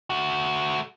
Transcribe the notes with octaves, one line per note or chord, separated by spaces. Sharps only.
A3 F#4